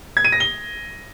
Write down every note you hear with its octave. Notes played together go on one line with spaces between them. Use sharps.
G#6
D#7
A#6
G7